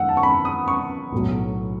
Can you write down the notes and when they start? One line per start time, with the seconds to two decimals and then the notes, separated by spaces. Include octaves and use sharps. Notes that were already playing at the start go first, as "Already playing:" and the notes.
Already playing: F#2 D#3 G#3 D#4 F#5 E6 F#6
0.09 A5
0.17 C#6
0.23 B5
0.45 D#6
0.68 C#6
1.12 B1 A2 F#3